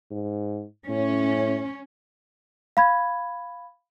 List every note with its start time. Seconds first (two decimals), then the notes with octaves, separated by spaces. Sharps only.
0.11 G#2
0.89 A2 C#4
2.77 F5 B5 G#6